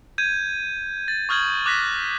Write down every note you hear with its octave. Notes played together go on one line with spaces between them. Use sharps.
G6 G#6 D#7
A6
C#6 D#6 F6 G6 G#6 F#7
D6 F#6 A#6 B6